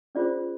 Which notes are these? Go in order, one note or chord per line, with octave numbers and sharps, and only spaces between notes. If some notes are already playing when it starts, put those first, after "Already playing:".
C#4 F4 G#4 C5 D5